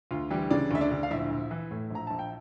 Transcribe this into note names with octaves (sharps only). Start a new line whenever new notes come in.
D2 F4
E3 G3 G4
C#3 D4 D5
D2 E5
D4 D5
D2
F5
A#1 E4 E5
A#1
E3
A2
A#1 A#5
A#1 A5
G5